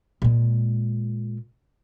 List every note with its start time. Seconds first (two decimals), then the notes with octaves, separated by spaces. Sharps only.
0.22 A#2 G#3